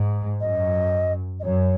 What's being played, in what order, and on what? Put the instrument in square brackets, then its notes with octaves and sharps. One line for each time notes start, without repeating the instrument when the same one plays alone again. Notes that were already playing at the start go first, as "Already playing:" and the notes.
Already playing: [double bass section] G#2
[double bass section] F#2 [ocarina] D#5
[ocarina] D#5
[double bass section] F#2 [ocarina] C#5